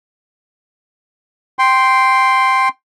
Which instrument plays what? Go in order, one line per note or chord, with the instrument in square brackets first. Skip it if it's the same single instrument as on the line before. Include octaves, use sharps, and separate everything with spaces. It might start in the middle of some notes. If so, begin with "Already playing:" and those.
[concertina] G5 C6